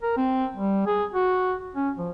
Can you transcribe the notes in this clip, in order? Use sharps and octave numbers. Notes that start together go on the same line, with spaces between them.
A#4
C4
G3
G#4
F#4
C#4
F3